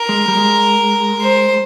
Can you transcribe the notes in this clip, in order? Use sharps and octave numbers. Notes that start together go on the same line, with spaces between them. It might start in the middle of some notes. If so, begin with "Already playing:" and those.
Already playing: A#4
G#3
G3
G#3
C5